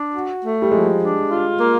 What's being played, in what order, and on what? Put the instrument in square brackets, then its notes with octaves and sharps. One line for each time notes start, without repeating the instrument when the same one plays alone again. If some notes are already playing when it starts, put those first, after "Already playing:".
Already playing: [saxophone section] D4
F#4
A3
[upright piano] G3
[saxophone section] F3 [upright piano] G#3
[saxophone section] D4
F4
A#3